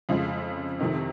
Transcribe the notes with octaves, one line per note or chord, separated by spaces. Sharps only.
F2 C#3 F3 G#3
F2 C3 D#3